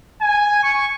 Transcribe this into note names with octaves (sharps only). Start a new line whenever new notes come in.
G#5
C#6